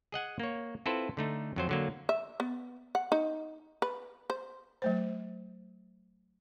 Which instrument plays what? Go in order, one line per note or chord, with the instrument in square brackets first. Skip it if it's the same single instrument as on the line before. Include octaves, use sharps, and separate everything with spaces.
[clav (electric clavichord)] G#4 D#5 F#5 G#5
A#3 C#5
C4 E4 F4 A4 B4 C5
D3 A3 D#4
F2 F#3 C5
D3 F#3 A#3
[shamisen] E5
B3
F#5
D#4
B4
C5
[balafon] F#3 A3 C5